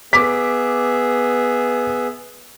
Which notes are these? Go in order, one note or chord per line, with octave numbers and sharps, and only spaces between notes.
B3 G#4 E5 D6 B6